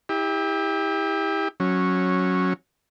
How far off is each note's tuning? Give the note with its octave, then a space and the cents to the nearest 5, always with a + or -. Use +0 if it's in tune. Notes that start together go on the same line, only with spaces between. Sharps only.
E4 -30 G4 +25
F#3 -5 C#4 -10